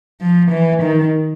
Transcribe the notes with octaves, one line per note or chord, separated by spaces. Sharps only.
F3
E3
D#3